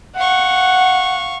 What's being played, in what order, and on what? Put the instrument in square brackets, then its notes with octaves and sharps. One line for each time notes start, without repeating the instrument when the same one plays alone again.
[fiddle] F5 C#6 [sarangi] F#5